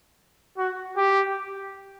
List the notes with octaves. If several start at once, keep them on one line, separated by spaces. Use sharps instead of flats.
F#4
G4